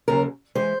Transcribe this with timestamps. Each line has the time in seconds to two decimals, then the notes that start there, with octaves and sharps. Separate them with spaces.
0.08 D#2 C#3 F#3 A#4
0.55 E3 G#3 C5